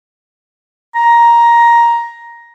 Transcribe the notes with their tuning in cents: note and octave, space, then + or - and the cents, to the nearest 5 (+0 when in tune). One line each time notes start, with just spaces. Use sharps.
A#5 +10